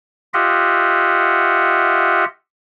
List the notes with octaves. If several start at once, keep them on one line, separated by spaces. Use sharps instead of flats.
F4 G4 D#5 E5 F#5